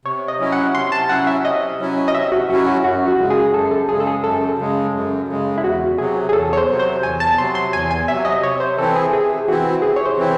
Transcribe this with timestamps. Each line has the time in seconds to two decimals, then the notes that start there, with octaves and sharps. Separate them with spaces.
0.05 C3 C#5
0.28 D#5
0.40 F#3 C#4 E4
0.52 F#5
0.75 C3 C6
0.92 A5
1.09 F#3 C#4 E4 F#5
1.27 E5
1.45 C3 D#5
1.80 F#3 C#4 E4
2.08 D#5
2.14 C3 E5
2.32 F#4
2.49 F#3 C#4 E4 F#4
2.67 F#4
2.84 F#2 F#4
3.08 F#4
3.20 C#3 G#3
3.30 G#4
3.54 F#2 A4
3.71 A4
3.89 C#3 G#3 G#4
4.00 A4
4.07 G#4
4.24 F#2 A4
4.59 C#3 G#3
4.94 F#2
5.29 C#3 G#3
5.58 E4
5.63 E2 F#4
5.98 C3 F#3 G#4
6.29 G#4
6.33 E2 A4
6.53 C#5
6.57 C5
6.69 C3 F#3
6.79 C5
7.03 E2 G#5
7.20 A5
7.38 C3 F#3 C6
7.55 C6
7.73 E2 G#5
7.91 G#5
8.08 C3 F#3 E5
8.25 D#5
8.43 C3 C#5
8.60 C5
8.78 E3 C4 E4 A4
8.96 G#4
9.12 C3 G#4
9.48 E3 C4 E4 F#4
9.82 C3 G#4
9.96 C#5
10.06 C5
10.17 E3 C4 E4